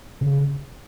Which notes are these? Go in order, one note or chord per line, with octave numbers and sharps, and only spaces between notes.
C#3